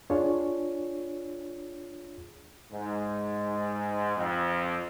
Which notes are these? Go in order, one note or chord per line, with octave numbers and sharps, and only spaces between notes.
D4 F4 G#4 C#5
G#2
F2